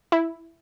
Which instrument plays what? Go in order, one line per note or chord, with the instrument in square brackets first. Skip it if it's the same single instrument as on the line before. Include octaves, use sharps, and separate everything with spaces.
[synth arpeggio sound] E4